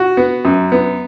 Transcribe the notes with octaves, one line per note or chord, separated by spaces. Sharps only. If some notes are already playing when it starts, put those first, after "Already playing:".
Already playing: F#4
B3
F#2
B3